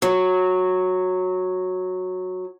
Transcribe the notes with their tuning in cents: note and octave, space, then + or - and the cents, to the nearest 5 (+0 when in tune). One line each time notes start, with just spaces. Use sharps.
F#3 -10